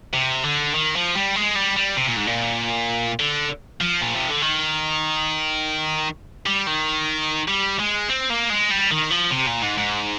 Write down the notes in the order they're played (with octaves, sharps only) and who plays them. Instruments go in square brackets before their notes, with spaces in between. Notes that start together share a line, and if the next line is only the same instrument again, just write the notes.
[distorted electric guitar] C3
D3
D#3
F3
G3
G#3
G3
G3
C3
A#2
G#2
A#2
D3
F3
A#2
C3
D3
D#3
G3
D#3
G3
G#3
C4
A#3
G#3
G3
D#3
F3
C3
A#2
G#2
G#2